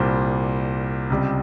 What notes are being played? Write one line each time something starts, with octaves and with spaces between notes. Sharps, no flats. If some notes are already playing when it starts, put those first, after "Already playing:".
Already playing: C2 A#2 G3 C5
C#2 C3 G3